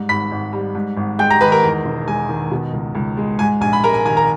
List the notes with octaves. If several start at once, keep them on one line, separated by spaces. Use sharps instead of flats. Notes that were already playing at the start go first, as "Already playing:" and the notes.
Already playing: G#2 G3
G#1 B5 B6
G#1
G3
G#2
G#1
G#3 G5 G6
A#5 A#6
D#3 B4 B5
A#4 A#5
E2
E1
G#3 G#5
D#3
B2
C#2
C#2
G#3
G#2 G#5
A#1 G#5
B5
G#3 A#4 A#5
G#5
D#3 G#5
A#4 A#5